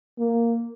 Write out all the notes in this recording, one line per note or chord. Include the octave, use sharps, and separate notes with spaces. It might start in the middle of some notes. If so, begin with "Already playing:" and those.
A#3